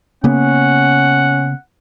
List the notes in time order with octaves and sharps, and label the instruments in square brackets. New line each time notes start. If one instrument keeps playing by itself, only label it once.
[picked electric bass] C#3 A#3 B3 [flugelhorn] C#4 [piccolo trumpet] F#5